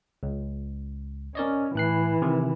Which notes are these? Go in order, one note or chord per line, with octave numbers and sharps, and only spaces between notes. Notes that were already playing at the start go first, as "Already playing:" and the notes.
C#2
C#4 A#4 D5 D#5
A2 E3 F#6 C7
C3 D#3